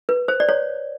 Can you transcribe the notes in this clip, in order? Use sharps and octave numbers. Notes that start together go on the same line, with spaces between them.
B4
C5
D5
C#5